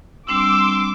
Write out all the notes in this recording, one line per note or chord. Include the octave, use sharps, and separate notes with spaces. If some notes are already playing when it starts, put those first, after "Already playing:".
G3 C4 D4 C6 D6 E6